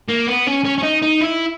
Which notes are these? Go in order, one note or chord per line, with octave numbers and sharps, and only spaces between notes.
A#3
B3
C#4
C#4
C#4
D#4
D#4
E4